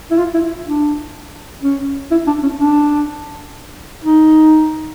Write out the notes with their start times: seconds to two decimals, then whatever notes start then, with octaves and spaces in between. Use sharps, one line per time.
0.11 E4
0.18 F4
0.34 E4
0.66 D4
1.63 C#4
2.11 E4
2.27 D4
2.43 C#4
2.58 D4
4.04 D#4